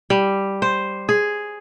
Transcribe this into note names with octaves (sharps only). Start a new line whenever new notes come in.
G3
C5
G#4